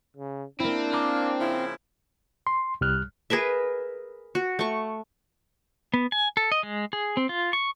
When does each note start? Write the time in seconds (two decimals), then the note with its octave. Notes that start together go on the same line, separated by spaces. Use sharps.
0.17 C#3
0.60 A#3 C4 D4 E4
0.92 A#3 G#5 A#5 D6
1.39 C#3 F3 E4
2.47 C6
2.81 C2 G3 F6 F#6
3.30 G#4 A#4 B4 E5
4.35 F#4
4.59 A3 C#6
5.94 B3
6.12 G#5
6.37 A4
6.52 D#5
6.63 G#3
6.93 G#4
7.17 C4
7.29 F4
7.53 C#6